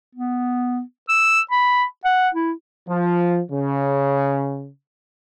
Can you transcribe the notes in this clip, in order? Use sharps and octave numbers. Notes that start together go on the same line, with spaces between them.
B3
E6
B5
F#5
E4
F3
C#3